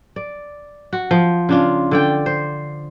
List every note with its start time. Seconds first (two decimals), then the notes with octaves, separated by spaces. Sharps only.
0.16 D5
0.93 F#4
1.11 F3
1.49 C#3 D4 F4
1.91 D3 D5 G5
2.26 C5